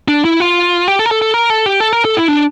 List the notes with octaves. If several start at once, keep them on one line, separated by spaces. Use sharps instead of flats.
D4
E4
F4
G4
A4
A#4
A4
A4
A#4
A4
G4
A4
A#4
A4
E4
D4